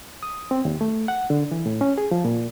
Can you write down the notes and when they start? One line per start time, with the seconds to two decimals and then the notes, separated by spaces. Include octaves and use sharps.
0.23 D#6
0.51 C4
0.65 D#2
0.81 A3
1.08 F#5
1.30 D3
1.51 E3
1.66 A2
1.81 C#4
1.98 G#4
2.11 F3
2.25 A#2